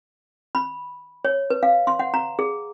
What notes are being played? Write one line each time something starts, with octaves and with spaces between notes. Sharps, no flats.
B5
C#5
B4
F5
C6
F#5
A#5
G#4